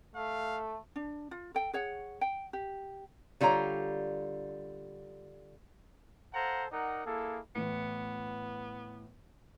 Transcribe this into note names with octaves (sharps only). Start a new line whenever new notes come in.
A3 F5
D4
F4
A4 G5
G#4 C#5 F#5
G5
G4
D3 G3 F4 C#5 A#5
A4 C5 F5 F#5 A5 A#5
D#4 A#4 D5 F#5
A#3 E4 G#4 A4
A2 E3 B3